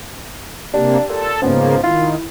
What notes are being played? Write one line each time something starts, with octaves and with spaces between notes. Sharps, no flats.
C3 A#3 D4 G4
A#2 A4
G#2 C#3 F3 A#3 B3 C#4
D#3 E4 F4